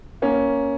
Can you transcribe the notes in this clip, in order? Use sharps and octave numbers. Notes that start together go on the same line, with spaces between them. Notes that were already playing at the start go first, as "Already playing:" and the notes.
A#3 C#4